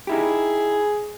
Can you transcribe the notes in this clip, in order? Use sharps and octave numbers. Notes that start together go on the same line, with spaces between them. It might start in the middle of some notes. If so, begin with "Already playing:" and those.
D#4 E4 G4 G#4